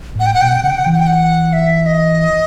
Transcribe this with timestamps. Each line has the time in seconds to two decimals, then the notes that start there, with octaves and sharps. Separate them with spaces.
0.15 G#2
0.19 A2 F#5
0.26 G5
0.34 F#5
0.41 B2 G5
0.49 F#5
0.56 G5
0.63 C#3 F#5
0.70 G5
0.78 F#5
0.85 E3 G5
0.92 F#5
1.00 G5
1.07 F#5
1.53 E5
1.86 D#5